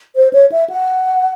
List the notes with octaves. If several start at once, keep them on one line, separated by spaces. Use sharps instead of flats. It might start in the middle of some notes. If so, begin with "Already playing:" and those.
C5
C#5
E5
F#5